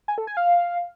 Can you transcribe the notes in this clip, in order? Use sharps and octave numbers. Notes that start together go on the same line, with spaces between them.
G#5
A4
G#5
F5